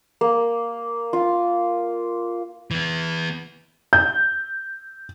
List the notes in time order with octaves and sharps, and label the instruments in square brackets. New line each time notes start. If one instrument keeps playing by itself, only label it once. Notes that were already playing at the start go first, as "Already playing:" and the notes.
[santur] A#3
F4
[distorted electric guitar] E3 B3
[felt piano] G6